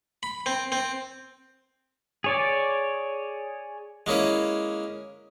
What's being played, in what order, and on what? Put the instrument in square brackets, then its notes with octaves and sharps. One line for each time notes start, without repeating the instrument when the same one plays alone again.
[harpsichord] B5
C4
C4
[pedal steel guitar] G#4 C#5 D5
[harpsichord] G#3 A#3 C#4 E4